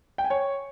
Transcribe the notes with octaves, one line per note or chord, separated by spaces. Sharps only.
G5
G#5
C#5